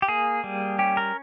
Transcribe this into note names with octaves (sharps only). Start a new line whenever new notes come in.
G4
A#3 G#4
G3
C#4 G4
A#4